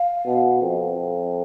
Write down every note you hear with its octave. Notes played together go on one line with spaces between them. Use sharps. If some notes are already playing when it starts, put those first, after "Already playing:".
Already playing: F5
B2
F2